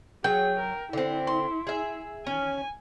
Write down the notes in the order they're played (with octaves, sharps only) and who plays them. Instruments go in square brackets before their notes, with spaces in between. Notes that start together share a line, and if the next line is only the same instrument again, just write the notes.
[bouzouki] F#3 [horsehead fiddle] G#4 [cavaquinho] G5
[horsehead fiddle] A#4
[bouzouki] D3 C4 [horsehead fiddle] E4
[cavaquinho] C6
[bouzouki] G#4 E5
[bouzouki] C#4 [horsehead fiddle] G#5